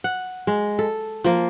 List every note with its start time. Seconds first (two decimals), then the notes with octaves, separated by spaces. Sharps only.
0.04 F#5
0.47 G#3
0.79 A4
1.24 F3 A#3